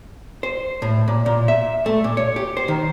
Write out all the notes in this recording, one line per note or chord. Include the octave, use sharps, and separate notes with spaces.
C5
A2
A#2
A#2
E5
A3
A#2
C#5
G4
C5
D#3